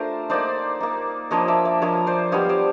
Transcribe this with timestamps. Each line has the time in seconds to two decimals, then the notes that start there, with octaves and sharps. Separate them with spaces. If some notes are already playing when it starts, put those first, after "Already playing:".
Already playing: A3 D4 F4 A#4 C5
0.30 A#3 D#4 C5 D5
0.80 A#3 D#4
1.31 F3 A#3 D4 C#5 D#5
1.48 D5 E5
1.65 D5 E5
1.82 F3 A#3 D4 C#5 D#5
2.07 C5 D5
2.32 G3 B3 D4 F4 C#5 D#5
2.49 C5 D5